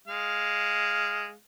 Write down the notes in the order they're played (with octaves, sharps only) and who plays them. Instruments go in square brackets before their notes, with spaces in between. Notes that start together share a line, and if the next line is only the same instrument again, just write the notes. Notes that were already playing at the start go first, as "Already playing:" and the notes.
[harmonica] G#3 F5